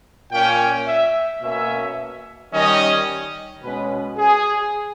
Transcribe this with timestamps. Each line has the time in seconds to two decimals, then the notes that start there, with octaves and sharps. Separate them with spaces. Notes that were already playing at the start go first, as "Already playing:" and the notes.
0.32 A#2 A#3 C#4 G5
0.87 E5
1.42 B2 A#3 C#4 E5
2.53 D#3 G3 C#4 D#5
3.63 B2 G#3 C#4 B4
4.18 G#4